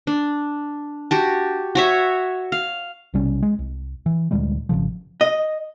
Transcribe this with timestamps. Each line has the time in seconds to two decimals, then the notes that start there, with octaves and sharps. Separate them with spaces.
0.07 D4
1.11 F#4 G4 A5
1.75 F#4 C#5 E5
2.52 F5
3.14 B1 C3 G3 C#4
3.43 G#3
3.59 C2
4.06 E3
4.31 D2 A#2 G3 G#3
4.69 G#1 D#2 C#3 F3
5.21 D#5